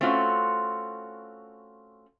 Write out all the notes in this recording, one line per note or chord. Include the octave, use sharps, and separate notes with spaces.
A3 C4 C#4 F4 F#4